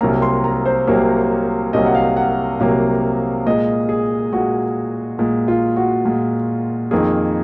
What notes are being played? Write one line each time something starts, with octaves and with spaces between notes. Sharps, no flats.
C2 C3 F#3 A#3 A#5
C6
A#5
C5
C2 C3 F#3 A#3 C#5
C2 C3 F#3 A#3 D#5
F#5
F5
F#5
C2 C3 F#3 A#3 F5
A#2 G#3 D#5
G#4
A#2 G#3 F#4
A#2 G#3
F4
F#4
A#2 G#3
F2 D#3 A#3 G#4